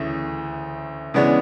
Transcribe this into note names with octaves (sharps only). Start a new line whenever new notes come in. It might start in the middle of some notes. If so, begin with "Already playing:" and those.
Already playing: D2 C#3 E3 A3
C#3 E3 G#3 B3 D4